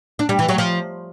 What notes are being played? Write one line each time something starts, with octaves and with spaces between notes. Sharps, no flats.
D4
G3
E3
F#3
F3